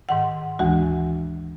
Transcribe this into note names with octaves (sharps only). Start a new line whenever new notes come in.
G#2 D#3 F#5
D2 E3 G#3 F#4